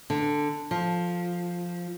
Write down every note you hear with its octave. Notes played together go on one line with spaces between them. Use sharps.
D3
F3